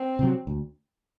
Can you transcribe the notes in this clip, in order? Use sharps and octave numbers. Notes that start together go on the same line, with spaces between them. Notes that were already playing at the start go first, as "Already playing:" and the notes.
Already playing: C4
C3 F#3
D2